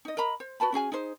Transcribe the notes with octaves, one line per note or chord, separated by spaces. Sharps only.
D#4 D#5
A#4 D#5 A#5 B5
C5
F#4 B4 A5 B5
C#4 F#4 G#4 G#5
D#4 G#4 C5